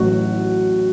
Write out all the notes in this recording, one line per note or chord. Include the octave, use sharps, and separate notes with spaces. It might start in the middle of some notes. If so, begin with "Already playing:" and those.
Already playing: A1 A2 F#3 F#4